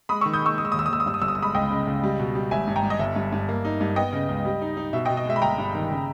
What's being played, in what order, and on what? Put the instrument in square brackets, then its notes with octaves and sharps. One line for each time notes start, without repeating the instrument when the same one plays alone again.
[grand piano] G#3 [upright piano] B5 D#6
[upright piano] C#6 E6
[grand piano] D#3
[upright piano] D#6 G6
[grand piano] G#3 [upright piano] C#6 E6
[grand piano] G#3 [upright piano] D#6
[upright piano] E6
[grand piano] D#2 [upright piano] D#6
[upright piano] E6
D#6
[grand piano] D#2 [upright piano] E6
[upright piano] D#6
[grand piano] G2 [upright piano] E6
[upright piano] D#6
[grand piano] G1 [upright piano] E6
[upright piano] D#6
E6
[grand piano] G#3 [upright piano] B5 D#6
[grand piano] C#2 [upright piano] D#5 G5
[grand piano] C#3
C#2
G3
B2
G3
[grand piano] G#1 [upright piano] E5 G#5
[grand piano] G2
[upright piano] G5 A#5
[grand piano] G2
[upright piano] D#5
[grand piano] G1 [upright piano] E5
[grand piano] G2
G2
A#3
D#4
G2
[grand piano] B3 [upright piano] D#5 G5
[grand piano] C#3
C#2
G3
D#4
D#4
[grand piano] B2 [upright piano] E5
[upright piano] D#5 G5
[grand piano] B2
[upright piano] D#5
[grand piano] G#3 [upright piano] E5
[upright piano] B5
[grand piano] G1 [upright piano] G5 A#5
[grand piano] G2
D#3
C#3